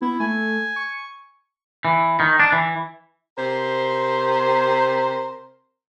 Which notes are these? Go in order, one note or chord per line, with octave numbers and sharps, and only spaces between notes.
B3 E4
A3 G#5
C#6
E3
D#3
D4
E3
C3 A#4 C5